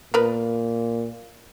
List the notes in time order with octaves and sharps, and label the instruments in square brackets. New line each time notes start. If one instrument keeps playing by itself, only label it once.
[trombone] A#2 [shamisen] B3 A#4 B4